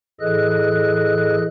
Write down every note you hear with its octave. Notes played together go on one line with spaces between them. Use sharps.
A2 E3 G#4 A4 D#5 F#6